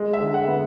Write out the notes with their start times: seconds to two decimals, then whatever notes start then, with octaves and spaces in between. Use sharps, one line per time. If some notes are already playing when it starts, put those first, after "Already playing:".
Already playing: G#3
0.13 E5
0.20 D3
0.34 F#5
0.47 B3